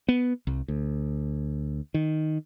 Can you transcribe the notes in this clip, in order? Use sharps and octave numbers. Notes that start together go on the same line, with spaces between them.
B3
C2
D2
D#3